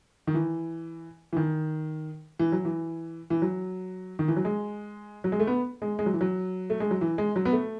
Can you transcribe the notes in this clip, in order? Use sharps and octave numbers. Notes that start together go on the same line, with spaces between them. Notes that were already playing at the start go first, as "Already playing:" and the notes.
D#3
E3
E3
D#3
E3
F#3
E3
E3
F#3
D#3
E3
F#3
G#3
F#3
G#3
A3
B3
G#3
G#3
F#3
E3
F#3
A3
G#3
F#3
E3
G#3
F#3
B3
A3